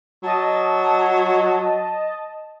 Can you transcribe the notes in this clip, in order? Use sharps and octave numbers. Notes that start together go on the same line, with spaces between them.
F#3 D#5 A5